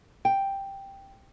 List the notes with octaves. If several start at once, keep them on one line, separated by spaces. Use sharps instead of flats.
G5